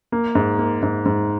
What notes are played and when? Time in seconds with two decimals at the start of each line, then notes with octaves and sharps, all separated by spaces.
0.12 A#3
0.35 G#2
0.59 A#3
0.82 G#2
1.06 G#2